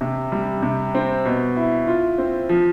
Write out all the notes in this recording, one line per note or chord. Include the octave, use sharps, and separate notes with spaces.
C3
G3
C3
C4
B2
E4
F4
C4
F3